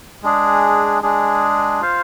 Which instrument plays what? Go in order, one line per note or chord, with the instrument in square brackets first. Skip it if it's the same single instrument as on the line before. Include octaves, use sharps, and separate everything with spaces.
[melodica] G#3 D4 G#4
G#3 D4 G#4
F4 C5 F5